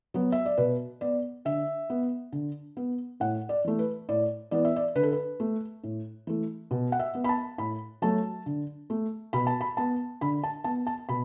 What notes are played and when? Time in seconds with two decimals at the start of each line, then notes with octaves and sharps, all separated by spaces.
0.14 F#3 B3
0.32 E5
0.46 D5
0.58 B2 B4
1.01 B3 D5
1.45 D3 E5
1.90 B3
2.32 D3
2.77 B3
3.20 A2 F#5
3.49 D5
3.64 E3 A3
3.79 B4
4.09 A2 D5
4.51 E3 B3 D5
4.65 E5
4.76 D5
4.95 D3 B4
5.03 A4
5.12 B4
5.40 A3
5.84 A2
6.27 E3 A3
6.71 B2
6.92 F#5
6.99 E5
7.15 B3
7.24 B5
7.29 A5
7.58 A2 B5
8.02 F#3 A3 A5
8.46 D3
8.90 A3
9.33 B2 B5
9.47 A5
9.61 B5
9.77 B3 A5
10.21 D3 B5
10.43 A5
10.64 B3 A5
10.87 A5
11.09 B2 B5